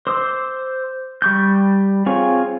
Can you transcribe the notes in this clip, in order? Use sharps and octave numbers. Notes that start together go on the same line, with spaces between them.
C5 D6 E6
G3 C#6 G6
C4 F4 G#4 C#5 C#6